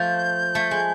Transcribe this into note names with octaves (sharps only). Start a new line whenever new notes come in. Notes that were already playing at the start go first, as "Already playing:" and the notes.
Already playing: F3 A3 G6
A3
G#3